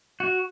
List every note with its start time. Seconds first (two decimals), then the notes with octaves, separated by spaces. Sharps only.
0.20 F#4